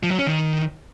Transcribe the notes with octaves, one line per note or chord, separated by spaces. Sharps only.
F3
F#3
C#4
D#3